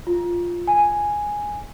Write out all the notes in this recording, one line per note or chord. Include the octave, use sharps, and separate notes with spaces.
F4
G#5